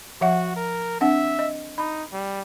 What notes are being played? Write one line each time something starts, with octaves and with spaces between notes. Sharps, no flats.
F3 F#4 E5 F#5
A#4
C4 D4 E5 F#5
D#5
D#4 B5
G3